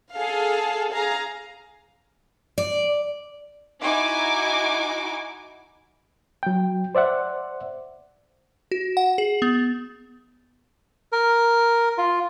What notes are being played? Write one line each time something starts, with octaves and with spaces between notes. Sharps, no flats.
G#4 A4 F5
G#4 F5 A#5
D5
D#4 E4 F#4 G#5 D6
F#3 G5
C5 D5 E5 F#5
F#4
F#5
G#4
B3
A#4
F4